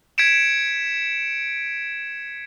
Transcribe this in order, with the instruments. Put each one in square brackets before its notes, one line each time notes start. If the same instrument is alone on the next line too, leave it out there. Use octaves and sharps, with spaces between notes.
[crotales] G#6 B6 C#7 D7 E7